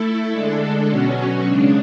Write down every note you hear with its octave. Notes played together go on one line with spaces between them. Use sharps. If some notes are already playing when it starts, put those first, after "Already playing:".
Already playing: A3 E4 A4
D3 G#3 D4 A4
B2 F#3 C#4 F#4
C#3 G#3 D4